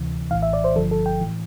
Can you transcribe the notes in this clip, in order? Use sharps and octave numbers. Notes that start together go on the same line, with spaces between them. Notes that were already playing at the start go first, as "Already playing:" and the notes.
Already playing: D2 C3 E3
A#1 A2 E3 F5
E5
D5
C5
G1 G2 D3 F3 A4
A4
G5
A2 E3